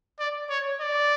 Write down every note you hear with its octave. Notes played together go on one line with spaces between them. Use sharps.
D5
C#5
D5